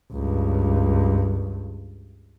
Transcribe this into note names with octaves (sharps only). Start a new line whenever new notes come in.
C#2 G2